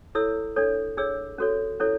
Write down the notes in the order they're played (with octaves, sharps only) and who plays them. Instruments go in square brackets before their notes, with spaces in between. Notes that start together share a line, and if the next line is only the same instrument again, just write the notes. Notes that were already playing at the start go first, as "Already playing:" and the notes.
[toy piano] E4 A4 C#5 E6
D4 A4 C#5
D4 G#4 C#5 E6
C#4 F#4 A4 C#5
C#4 E4 A4 C#5